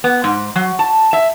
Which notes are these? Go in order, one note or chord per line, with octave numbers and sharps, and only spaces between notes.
B3
G#2
F#3
A5
E5